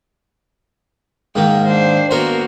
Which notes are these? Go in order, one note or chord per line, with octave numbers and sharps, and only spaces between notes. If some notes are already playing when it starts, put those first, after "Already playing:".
G#2 D#3 A#3 G5
D4 C5
A#3 B3 F#4 A#4 C5